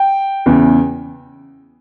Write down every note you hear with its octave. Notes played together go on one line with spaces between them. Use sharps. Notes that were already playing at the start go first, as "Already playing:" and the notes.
Already playing: G5
E2 C#3 E3